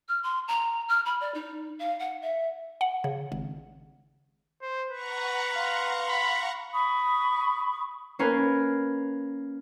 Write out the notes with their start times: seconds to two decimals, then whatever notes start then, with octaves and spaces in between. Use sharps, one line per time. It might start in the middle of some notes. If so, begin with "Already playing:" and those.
0.08 F6
0.23 C6
0.48 A#5
0.89 F6
1.05 B5
1.21 D5
1.34 D#4
1.79 F5
1.99 F#5
2.22 E5
2.81 F#5
3.04 C#3
3.32 G#1
4.62 C5
4.91 B4 F#5 A#5 C#6
5.53 F5 C6
6.09 B5
6.73 B5 C#6 D#6
8.19 A#3 C#4 A#4 B4